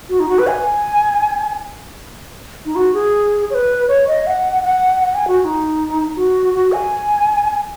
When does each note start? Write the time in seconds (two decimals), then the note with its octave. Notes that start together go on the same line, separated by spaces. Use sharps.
0.09 F#4
0.20 D#4
0.29 F#4
0.39 B4
0.47 G#5
2.66 D#4
2.76 F#4
2.94 G#4
3.50 C#5
3.54 B4
3.88 C#5
4.07 D#5
4.27 F#5
4.64 F#5
5.03 F#5
5.14 G#5
5.28 F#4
5.40 F#4
5.45 D#4
6.16 F#4
6.54 F#4
6.73 G#5